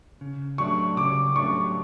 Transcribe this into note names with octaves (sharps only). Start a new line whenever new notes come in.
C#3
F#3 A3 D4 C#6
C#3 D6
F#3 A3 D4 C#6